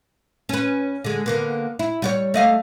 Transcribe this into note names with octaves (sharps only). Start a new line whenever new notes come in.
C#4 B4
D3 G#3
D3 A#3 B3
E4
G3 F#4 C#5
A3 D#5 F5